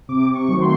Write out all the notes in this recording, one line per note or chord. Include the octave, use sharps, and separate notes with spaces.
C3 D6
C#6
D#3 F#3 A3 C4
C6